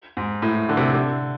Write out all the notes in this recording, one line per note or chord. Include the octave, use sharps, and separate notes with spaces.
G#2
A2
D3
C3
D3